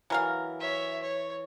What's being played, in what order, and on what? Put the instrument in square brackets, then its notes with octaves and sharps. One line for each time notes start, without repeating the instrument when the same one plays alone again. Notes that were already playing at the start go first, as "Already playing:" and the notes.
[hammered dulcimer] E3 [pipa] F#3 A#4 F5
[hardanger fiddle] C#5 E5
C#5